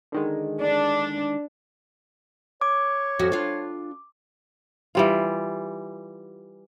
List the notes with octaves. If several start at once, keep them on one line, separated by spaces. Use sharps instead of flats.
D3 D#3 G#3
D4
C#5 D6
F2 F#4
D4 F4
E3 G3 F4